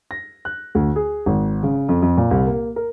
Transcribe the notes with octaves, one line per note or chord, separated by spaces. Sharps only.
A#6
F#6
D2
G#4
G#1
C#3
F2
F2
A#2
C2
A#3
A#4